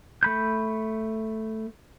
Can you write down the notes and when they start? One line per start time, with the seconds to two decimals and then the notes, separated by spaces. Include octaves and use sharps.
0.23 A3 B5 G6